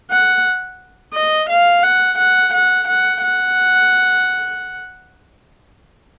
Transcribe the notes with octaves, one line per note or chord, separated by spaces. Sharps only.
F#5
D#5
F5
F#5
F#5
F#5
F#5
F#5